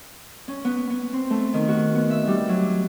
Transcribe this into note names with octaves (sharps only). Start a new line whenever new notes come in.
C#4
B3
B3
C4
A3
D#3
F#4
B3
E5
G3
F#3